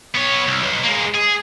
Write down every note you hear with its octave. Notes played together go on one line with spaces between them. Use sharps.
B3 C#5
C2
B1
G#3 A#3
G#4